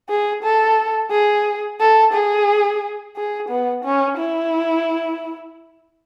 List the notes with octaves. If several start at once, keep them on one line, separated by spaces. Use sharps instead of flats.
G#4
A4
G#4
A4
G#4
G#4
B3
C#4
E4